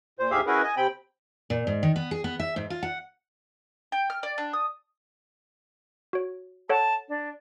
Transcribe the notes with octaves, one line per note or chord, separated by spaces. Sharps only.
A#2 C5
D2 G#2 G4 G#4 E5 F5
C#4 E4 F#4 G#4 A#4 B4
D#5 G#5
C3 C4 G5 B5
A#2
G#2
D#3
B3
G#4
B3
E5
G#2
F4
F#5
G5
F6
D5
D4
D#6
F#4 C#5
A4 C#5 F#5 A5
D4